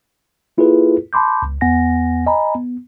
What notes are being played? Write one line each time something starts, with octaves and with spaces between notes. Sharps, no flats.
A#3 E4 F4 G#4 A4 B4
A5 B5 C6 D6 G6
C#2
E2 B3 F#5 G#5 A#6
D#5 G#5 A#5 B5
B3